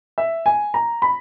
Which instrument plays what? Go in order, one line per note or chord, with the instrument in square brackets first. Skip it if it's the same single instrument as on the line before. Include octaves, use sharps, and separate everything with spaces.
[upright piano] E5
G#5
A#5
B5